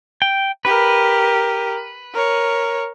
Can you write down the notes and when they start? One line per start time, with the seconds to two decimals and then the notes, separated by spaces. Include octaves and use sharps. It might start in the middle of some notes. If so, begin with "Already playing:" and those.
0.22 G5
0.65 G4 A#4 B4
2.14 A#4 C#5